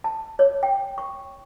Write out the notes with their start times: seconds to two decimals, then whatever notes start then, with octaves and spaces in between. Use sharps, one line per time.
0.04 A5
0.39 C#5
0.63 G5
0.98 C#6